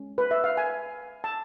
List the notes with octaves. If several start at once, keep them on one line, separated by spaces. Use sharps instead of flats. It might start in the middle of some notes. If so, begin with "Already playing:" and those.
Already playing: G#3 C#4
B4
E5
F5
G#5
A5